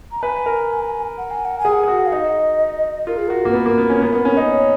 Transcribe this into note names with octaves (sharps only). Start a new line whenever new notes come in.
A#5
B4 G#5
A#4
F#5
G#5
F#5
G#5
G#4
F#5
G#4
F#4
F5
D#4 D#5
F4 A#4
G#4
F#4 A#4
A#3
B4
B3 A#4
A#3
B3
C#4
B3
B3
C#4
D#4
C#5